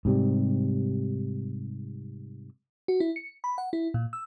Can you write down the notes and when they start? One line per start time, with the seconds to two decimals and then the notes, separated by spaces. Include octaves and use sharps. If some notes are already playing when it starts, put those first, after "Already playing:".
0.05 G#2 C3 G3
2.88 F#4
3.00 E4
3.16 C#7
3.44 B5
3.58 F#5
3.73 E4
3.94 A#2
4.13 E6